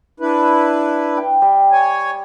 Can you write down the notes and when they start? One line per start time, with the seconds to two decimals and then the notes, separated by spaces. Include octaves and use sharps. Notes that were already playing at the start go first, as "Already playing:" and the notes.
0.20 D4 E4 B4
1.17 G5
1.42 G3
1.72 C#5 G#5